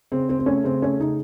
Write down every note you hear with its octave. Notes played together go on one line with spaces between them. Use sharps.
C#3 C4
C#3 C4
C4
A3 C#4
C#3 C4
A3 C#4
C#3 D#4